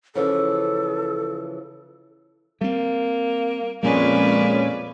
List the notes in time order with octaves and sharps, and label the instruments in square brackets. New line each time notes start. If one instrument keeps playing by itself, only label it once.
[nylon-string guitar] C#3 E3 F3 [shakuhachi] A4
[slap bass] G3 C4 [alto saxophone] A#3
[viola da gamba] F2 B4 D5 [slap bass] A#2 G3 [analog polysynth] G#3 C#4 [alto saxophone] A#3